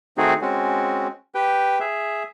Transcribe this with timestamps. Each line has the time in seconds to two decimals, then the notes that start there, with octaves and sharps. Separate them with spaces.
0.18 D#3 A3 C4 D#4 F#4 G#4
0.42 G#3 C4 C#4 F#4
1.35 G4 B4 G5
1.80 G#4 E5